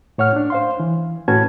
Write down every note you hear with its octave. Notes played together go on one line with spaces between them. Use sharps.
A2 C#5 F#5 F6
C#4 D4
C5 F5 C6
E3
A2 C#4 F#4 B4 A5 G#6